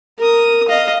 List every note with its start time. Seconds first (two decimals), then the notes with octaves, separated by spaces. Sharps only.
0.19 A#4 D#6
0.68 D#5 F5